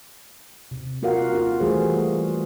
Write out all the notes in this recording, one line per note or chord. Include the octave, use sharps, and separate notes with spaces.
C3
A#3 F4 F#4 A#4 F5 F#5
F4 G4 A#4
E3 G3 A3 F#4 G#4 C5